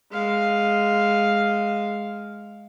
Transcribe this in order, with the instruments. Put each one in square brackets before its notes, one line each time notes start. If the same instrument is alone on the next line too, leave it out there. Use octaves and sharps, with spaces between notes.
[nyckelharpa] G#3 F5